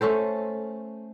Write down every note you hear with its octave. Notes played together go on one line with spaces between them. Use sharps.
A3 C#4 A4 C5